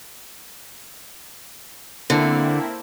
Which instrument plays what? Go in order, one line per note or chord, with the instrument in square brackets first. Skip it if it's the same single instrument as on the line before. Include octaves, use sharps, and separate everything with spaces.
[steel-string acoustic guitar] D3 [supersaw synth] A#3 C4 E4